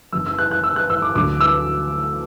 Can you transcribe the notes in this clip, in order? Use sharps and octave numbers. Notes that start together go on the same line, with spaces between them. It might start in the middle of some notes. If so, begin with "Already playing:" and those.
F#1 F#2 F#3 E6
E6
F#6
F#6
E6
F#6
E6
D6
D2 D3 F#3 D6
E6